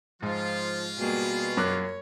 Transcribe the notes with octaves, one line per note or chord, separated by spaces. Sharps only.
G#2 F3 F4
B2 G3 A#3 G#4
F#2 C#5 D6 F#6